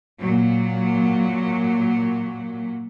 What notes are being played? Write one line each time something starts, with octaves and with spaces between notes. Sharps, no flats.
A#2 F#3